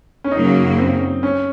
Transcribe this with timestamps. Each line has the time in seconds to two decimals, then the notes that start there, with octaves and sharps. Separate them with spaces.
0.24 C#4
0.31 F#2 C#3 F#3 A#3 D#4
0.77 C4
1.23 C#4